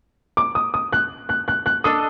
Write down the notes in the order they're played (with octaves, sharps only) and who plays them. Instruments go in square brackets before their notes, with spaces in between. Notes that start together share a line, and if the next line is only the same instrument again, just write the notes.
[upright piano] D6
D#6
D#6
F#6
F#6
F#6
F#6
[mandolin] D4 A4 D#5 [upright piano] D#6